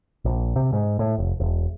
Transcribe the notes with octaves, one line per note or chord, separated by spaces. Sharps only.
A#1
C3
G#2
A2
F1
E1